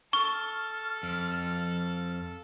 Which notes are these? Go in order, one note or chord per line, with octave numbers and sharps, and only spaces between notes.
A4 C#6 F6 G7
F2